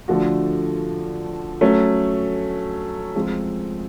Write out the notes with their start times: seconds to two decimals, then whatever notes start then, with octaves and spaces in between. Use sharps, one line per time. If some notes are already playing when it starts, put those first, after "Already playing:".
0.08 D3 F3 A3 D4 F#4
1.61 F#3 A3 C#4
3.16 F3 G#3 C4